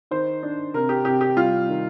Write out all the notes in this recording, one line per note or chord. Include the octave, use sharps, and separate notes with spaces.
D#3 C5
D4
C3 A#4
G4
C3 G4
G4
G3 F4
D#3